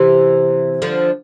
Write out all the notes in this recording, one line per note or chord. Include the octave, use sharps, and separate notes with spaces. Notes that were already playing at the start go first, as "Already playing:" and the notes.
Already playing: C3 E3
D3 F3